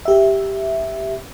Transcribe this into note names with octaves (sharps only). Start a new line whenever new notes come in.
G4 E5